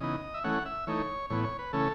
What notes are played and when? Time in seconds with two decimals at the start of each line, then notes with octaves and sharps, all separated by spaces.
0.01 C#3 E3 B3 D#4 D#5
0.34 E5
0.44 E3 A3 C#4 F#5
0.65 E5
0.87 E3 A3 D#4 C#5
1.30 A2 E3 B3 C#5
1.44 C#5
1.59 B4
1.73 C#3 E3 A3 C#4 A4